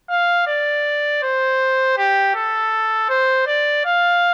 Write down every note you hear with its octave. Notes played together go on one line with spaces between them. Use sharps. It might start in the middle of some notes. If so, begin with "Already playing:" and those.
F5
D5
C5
G4
A4
C5
D5
F5